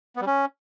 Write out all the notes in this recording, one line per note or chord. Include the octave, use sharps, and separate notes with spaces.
B3
G3
C#4